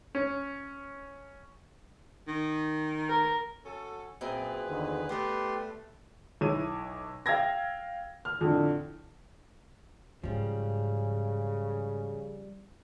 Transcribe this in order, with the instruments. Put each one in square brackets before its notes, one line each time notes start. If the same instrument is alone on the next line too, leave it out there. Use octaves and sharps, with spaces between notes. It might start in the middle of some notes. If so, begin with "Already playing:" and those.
[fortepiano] C#4
[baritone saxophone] D#3
[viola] A#4
[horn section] C#4 F#4 A4
[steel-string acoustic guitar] F#2 A#2 C4 [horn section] G#4 B4
[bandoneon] E2 D3 D#3
[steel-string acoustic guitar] G3 B3 [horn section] A3 [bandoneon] G4 B4 C6
[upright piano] B1 E4 C#5 D#7
F5 G5 E6 G#6 A#6
F6
F2 A2 D3
[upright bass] G#2 [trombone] C#3 [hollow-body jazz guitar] F3 G3